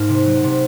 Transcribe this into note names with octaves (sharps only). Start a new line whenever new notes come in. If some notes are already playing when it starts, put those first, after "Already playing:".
Already playing: G#2 A#3 D#4
C3
F#3
C3